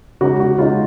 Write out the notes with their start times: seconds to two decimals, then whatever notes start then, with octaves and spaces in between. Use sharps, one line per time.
0.21 C#3 G#3 D#4 F#4
0.40 F#4
0.58 C#3 G#3 D#4 F4